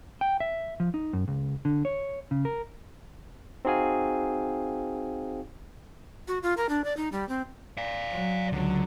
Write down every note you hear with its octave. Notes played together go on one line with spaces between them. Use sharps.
G5
E5
F3
D#4
F#2
C#2
D3
C#5
C#3
A#4
C4 D#4 F#4 G#4 F5 G#5
F#4
F4
A#4
D4
D5
D#4
G3
C4
D5 F5
F#3
C#2 D3 F#3